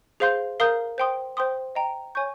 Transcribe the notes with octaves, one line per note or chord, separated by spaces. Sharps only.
G#4 C5 F5 C6 G6
A#4 F5 A#5 D#6 G6
C5 G5 C6 D#6
C5 G5 C6 D#6
D#5 G5 A#5
C#5 G#5 C#6 G6